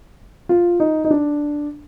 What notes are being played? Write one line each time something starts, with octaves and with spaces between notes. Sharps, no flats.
F4
D#4
D#4
D4